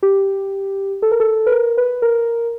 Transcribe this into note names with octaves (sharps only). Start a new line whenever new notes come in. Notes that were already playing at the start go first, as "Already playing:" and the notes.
G4
A4
A#4
A4
B4
A#4
B4
A#4